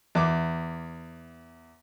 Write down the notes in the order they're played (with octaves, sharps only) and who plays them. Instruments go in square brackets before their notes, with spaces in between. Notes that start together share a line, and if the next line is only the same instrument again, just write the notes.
[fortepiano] E2 D6